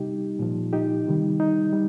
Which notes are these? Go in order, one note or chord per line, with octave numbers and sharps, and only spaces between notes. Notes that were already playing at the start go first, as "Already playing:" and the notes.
Already playing: C3 G3 D#4 G4
A#2 F3
D#4 G4
C3 D#3 G3
D#4
G3